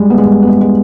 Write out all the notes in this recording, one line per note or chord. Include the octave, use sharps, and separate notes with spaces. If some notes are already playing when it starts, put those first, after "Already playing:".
Already playing: G3 G#3
B3
G#3
G3
B3
G#3
G#3